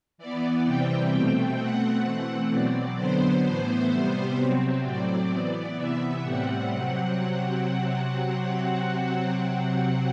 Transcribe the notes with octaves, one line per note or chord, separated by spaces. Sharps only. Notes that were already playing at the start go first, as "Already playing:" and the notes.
E3 B3 D5
C3 E3 G3 C4 G5
B2 A3 C4
B2 A3 C4 F#5
E3 A3 C4
B2 F#3 C4 D5
D3 F#3 B3 C5
A2 E3 B3 C5
C3 G3 B3 C5
C3 F#3 C4
A2 F#3 C4 D5
E3 B3
C3 E3 B3 E5
A2 G3 C4 F#5
C3 F#3 C4